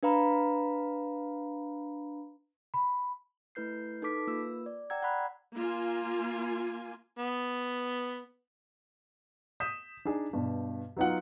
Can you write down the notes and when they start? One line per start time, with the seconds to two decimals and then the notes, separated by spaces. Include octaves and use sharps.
0.03 D4 B4 F5 A#5 B5
2.74 B5
3.55 A3 E4 B4 G6 C7
4.02 D#4 A4 B4 D6 B6
4.27 A#3 F4 B4 E6
4.66 D5
4.90 D5 F#5 G5 A#5 E6 G#6
5.02 F#5 G5 A#5 B5 F#6
5.55 A#3 F4 G#5
7.19 B3
9.60 D#6 G6 B6 E7
10.05 D4 D#4 G#4
10.33 G2 B2
10.97 F#3 B3 D#4 F4 F#5